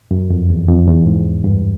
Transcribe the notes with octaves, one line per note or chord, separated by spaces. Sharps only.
F#2
F2
E2
F2
E2
G#2
G2